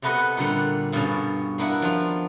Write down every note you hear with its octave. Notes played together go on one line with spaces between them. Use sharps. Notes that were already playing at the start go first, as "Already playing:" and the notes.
C3 A3 B3 B4 D#5 F#5
A#2 D3 G3 F#5
G2 B2 G3 C#4 F5 A5
A#3 B3 D4 E4 F#5
F3 D4 F4